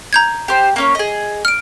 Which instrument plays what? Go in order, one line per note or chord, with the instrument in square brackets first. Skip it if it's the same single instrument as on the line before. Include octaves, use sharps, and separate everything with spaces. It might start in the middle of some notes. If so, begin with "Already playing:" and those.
[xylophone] A#5 G6 G#6
[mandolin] G4 C5
A#3 C#4 C#5
G#4 D#5
[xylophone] F6 D7